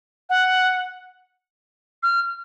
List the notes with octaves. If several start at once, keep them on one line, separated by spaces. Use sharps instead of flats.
F#5
F6